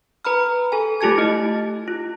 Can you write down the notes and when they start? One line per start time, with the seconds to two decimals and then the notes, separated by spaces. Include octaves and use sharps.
0.25 B4 A#5 B5 F6
0.72 A4 G#5
1.01 A3 F4 G4 A5 G#6
1.18 E4 D#5
1.88 F4